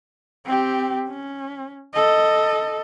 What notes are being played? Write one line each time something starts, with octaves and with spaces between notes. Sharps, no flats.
C4 G4
C#4
A4 D#5